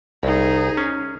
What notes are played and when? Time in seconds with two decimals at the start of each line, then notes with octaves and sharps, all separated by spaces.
0.23 C2 D#4 G#4
0.77 C#4